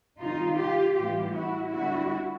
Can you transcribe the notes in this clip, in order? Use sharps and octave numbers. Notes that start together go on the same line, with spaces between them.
C3 D#3 G3 D#4 F4
F4 G4
A2 E3 G3 B3 F4 G4
E4 F#4
D3 G3 B3 E4 F#4